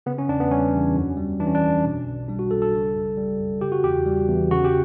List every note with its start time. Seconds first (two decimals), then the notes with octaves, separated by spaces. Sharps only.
0.06 C#3 B3
0.18 C#4
0.28 E2 D4
0.40 B3
0.51 G3 C#4
0.74 E2
0.96 F#2
1.17 G3
1.40 E3 D4
1.47 C#4
1.55 D4
1.62 G1
1.84 B2
2.07 B1
2.28 G3 D4
2.39 F#4
2.50 B1 A4
2.62 A4
2.73 C#3
2.95 F#2
3.17 G3
3.39 F#2
3.61 C#3 G4
3.72 F#4
3.83 E2 G4
4.06 G3
4.28 E2
4.51 C#3 F#4
4.65 G4